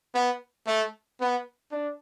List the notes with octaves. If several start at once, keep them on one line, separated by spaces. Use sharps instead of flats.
B3
A3
B3
D4